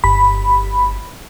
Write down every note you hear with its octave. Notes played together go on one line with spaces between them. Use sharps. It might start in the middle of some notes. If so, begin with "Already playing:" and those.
G1 B5